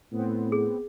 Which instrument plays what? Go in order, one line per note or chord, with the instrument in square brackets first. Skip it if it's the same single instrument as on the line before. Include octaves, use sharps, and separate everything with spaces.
[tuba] A2 [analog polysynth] B3 C4
[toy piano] G#4